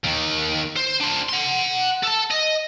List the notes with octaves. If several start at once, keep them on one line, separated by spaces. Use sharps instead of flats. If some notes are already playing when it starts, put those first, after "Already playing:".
D#2 D#3
C5
D4 C5
F#5 C6
A4 A5
D#5